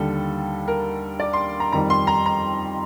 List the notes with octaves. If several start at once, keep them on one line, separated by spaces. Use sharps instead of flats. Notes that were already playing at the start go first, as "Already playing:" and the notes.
Already playing: D#2 D3 G3 A4
A#4
D5
C6
A#5
F2 D#3 G3 A#5
C6
A#5
A#5